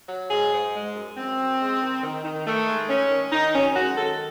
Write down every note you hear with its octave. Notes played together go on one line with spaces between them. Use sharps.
F#3
G#2 G#4
G#2
G#3
F#2
F#2 C4
F#2
G#3
D#3
D#3
D#3
D#3 A3
G#3
D#3 C#4
D#3
D#3 D#4
F#2 C#4
G#3 F#4
D#3 A4